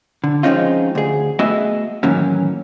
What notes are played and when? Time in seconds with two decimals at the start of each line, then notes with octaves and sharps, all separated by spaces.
0.24 D3
0.43 F3 G#3 C4 C#4 D#4 F4
0.95 D2 G#4
1.39 A3 B3 F#4 G#4 D#5 E5
2.03 A2 D#3 E3 F#3 A#3 C#4